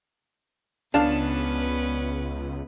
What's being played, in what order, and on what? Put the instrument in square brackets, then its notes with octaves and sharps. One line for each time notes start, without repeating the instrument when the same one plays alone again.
[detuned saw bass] C#2 [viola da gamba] B3 C#4 B4 [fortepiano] D4 F5 A5